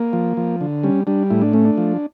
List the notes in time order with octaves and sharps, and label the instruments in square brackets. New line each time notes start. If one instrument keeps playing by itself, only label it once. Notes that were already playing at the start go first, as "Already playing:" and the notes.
Already playing: [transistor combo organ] A#3
F3
F3
D3
G3 C#4
G3 D4
A2 E4
D4
A3 C#4
D4
F3